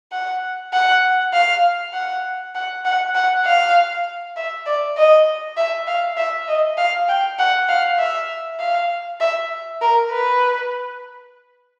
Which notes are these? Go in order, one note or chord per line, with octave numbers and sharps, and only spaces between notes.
F#5
F#5
F5
F#5
F#5
F#5
F#5
F5
E5
D5
D#5
E5
F5
E5
D#5
F5
G5
F#5
F5
E5
F5
E5
A#4
B4